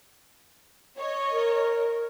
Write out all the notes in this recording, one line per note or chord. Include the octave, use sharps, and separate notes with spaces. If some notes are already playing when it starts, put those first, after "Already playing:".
C#5 D#5
A#4